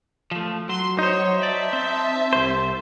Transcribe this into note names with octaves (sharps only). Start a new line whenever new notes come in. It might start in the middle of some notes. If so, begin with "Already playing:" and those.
F3 A3
F#3 C6
D#4 C5 C#5
D5 E5 A5
C4
C2 C5